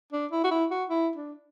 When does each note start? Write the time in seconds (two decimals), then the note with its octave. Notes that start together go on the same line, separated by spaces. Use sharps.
0.12 D4
0.32 E4
0.44 F#4
0.51 E4
0.71 F#4
0.90 E4
1.15 D4